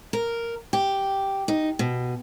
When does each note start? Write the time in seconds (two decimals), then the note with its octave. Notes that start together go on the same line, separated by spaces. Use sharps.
0.13 A#4
0.73 G4
1.48 D#4
1.79 B2